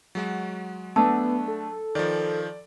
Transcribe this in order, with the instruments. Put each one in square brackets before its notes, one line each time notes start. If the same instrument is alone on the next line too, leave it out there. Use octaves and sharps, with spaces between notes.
[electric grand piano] F#3 G#3 F#4
[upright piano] A3 D4 [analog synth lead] B3 [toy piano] A5 D#6 E6
[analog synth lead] A4
[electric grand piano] D#3 F3 [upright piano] D5